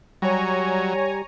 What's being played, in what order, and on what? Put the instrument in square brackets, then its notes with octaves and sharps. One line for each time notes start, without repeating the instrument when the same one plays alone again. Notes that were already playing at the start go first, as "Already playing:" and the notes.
[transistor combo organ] F#3 [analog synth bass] G3 [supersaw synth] C#5 G#5 A#5